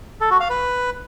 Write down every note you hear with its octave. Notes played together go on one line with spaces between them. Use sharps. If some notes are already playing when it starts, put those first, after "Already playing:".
A4
F#4
F5
B4